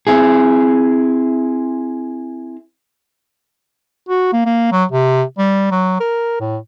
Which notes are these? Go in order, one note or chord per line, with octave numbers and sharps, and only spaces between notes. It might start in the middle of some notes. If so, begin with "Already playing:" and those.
C4 E4 G#4
F#4
A#3
A#3
F#3
C3
G3
F#3
A#4
A2